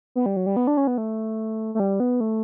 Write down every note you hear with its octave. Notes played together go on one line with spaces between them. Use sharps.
B3
G3
F#3
G3
B3
D4
C#4
B3
A3
A3
G3
B3
A3